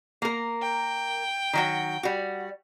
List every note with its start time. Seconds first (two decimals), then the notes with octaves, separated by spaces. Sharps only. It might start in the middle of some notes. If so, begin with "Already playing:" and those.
0.22 A#3 A#4
0.62 G5
1.53 D#3 F#3 F#4
2.03 G3 F#4